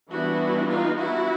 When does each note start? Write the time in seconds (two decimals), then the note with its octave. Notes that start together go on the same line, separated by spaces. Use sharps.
0.10 E3 G3 B3 D4 E4 F#4
0.69 D#4 F4
0.98 E4 F#4